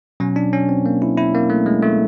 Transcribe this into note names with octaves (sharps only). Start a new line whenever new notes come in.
B2 F#3 C#4
D4
C#4
C4
A#3
E4
E4
A#3
A3
G#3
A3